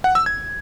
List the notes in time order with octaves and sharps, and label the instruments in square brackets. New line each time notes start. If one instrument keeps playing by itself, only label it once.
[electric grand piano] F#5
E6
G#6